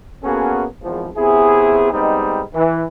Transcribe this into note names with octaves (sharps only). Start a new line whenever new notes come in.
A#3 B3 C#4 F#4 G#4 A4
G#1 E2 F3
C3 B3 E4 G#4
G3 G#3 B3 C4 D#4
E3